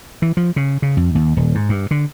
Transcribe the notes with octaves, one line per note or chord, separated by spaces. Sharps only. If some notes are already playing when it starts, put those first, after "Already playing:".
E3
F3
C#3
C#3
F2
D#2
D#1
G#2
G2
D3